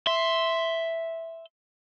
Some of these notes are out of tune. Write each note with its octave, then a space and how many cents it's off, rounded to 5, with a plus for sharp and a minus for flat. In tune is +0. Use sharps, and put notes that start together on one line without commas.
E5 +0 C6 +0